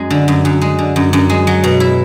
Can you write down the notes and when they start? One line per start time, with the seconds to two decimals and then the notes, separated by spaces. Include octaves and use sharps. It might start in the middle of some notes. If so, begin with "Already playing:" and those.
Already playing: F#2 G#3
0.10 D3
0.28 F#2
0.45 F#2
0.61 G#3
0.79 D3
0.96 F#2
1.13 F#2
1.30 G#3
1.47 F#3
1.64 B2
1.80 E4